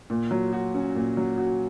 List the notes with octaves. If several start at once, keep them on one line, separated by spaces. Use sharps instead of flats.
A#2
F#3
F#4
C#4
A#2
F#3
F#4